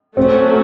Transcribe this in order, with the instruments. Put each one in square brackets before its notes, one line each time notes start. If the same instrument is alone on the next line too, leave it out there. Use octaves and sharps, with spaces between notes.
[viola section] F#3 A3 C#4 F#4 [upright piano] C4